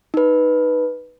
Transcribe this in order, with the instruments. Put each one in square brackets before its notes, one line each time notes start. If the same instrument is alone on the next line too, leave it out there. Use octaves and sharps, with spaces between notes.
[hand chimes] D#4 B4